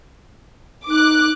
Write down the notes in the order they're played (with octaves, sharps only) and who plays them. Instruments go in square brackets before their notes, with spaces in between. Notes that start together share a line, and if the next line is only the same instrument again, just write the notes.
[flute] D#4 [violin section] D6 F#6